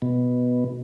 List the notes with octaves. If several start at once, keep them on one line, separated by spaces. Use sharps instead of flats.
B2